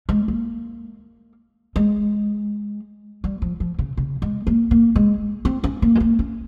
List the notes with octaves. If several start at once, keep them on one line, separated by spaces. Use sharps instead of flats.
G#3
A#3
G#3
G3
F3
F3
C#3
C#3
G#3
A#3
A#3
G#3
C4
C#4
A#3
G#3
A#3
C#4